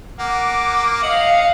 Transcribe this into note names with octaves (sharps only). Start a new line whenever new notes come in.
A#3 F#5 D6
D#5 F5 F#5